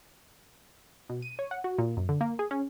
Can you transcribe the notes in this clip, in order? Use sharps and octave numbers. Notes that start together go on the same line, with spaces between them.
B2
D#7
C#5
F#5
F#4
A#2
F#2
D3
A#3
G#4
C#4